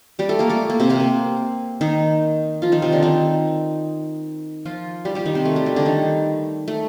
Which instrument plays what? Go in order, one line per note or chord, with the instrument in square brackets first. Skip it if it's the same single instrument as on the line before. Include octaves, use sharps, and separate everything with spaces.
[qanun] G3 G4
A3 A4
A#3 A#4
A3 A4
A#3
C3 C4
C3 C4
A#3
D#3 D#4
F3 F4
D#3 D#4
C3 C4
D3 D4
D#3 D#4
F3 F4
G3 G4
G3 G4
D#3 D#4
C3 C4
A3
G3
G3
D3 D4
D#3 D#4
A3